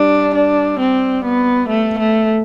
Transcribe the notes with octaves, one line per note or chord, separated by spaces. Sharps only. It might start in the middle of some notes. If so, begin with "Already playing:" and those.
Already playing: G3 D4
D4
C4
B3
A3
A3